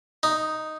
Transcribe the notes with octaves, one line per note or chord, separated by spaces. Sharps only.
D#4